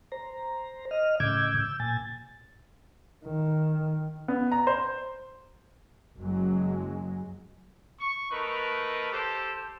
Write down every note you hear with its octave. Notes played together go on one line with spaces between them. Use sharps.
C5 A#5
D#5 F6
A2 C#3 D6 E6 G6 G#6
E6 G6
A#2 G#5 A6
D#3
B3
A#5
C5
F#1 F#3 G#3
C#6
A3 D#4 A#4 B4
G4 A4 C5